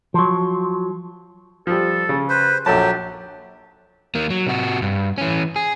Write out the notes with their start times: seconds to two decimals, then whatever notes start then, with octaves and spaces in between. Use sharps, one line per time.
0.14 F3 F#3
1.67 F3 G3 A4
2.09 C#3
2.30 B4 C5
2.66 A#1 F#3 G4 A4 A5
4.15 D#3 A#3
4.30 F#3
4.47 C3 F#4
4.82 G2
5.18 E3 C#4
5.56 G#4